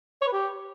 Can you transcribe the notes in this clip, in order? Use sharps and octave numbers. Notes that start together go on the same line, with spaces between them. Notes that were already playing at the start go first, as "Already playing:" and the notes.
C#5
B4
G4